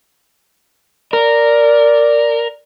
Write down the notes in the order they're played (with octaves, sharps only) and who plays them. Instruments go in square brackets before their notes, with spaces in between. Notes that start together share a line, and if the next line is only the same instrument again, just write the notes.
[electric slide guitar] A#4 [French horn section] D5